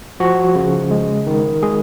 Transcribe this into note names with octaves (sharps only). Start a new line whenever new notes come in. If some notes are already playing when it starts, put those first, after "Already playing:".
F3 F#4
C#3
G#3
D#3
G#3 G#4